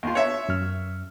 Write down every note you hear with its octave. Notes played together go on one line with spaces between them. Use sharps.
D#2 F4
C#5 E5
F#2 F6